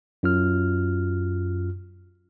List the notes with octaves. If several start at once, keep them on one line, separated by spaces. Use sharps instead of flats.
F#2 F4 F6